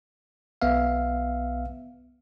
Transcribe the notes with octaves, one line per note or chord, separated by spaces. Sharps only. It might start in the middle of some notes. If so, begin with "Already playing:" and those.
B1 B3 E5 F5